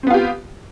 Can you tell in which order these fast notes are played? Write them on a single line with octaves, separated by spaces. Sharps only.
C4 B3 F4 G4